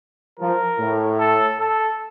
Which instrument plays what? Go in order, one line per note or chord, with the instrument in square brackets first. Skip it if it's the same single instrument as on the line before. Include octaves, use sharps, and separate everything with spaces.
[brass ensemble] F3 [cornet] A#4
[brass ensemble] A2
[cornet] A4
A4